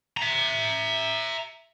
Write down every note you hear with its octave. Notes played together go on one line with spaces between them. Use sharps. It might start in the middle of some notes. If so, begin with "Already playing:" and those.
E5 A#5